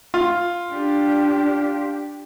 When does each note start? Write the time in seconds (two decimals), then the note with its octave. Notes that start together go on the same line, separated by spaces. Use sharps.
0.14 F4
0.73 D4 G4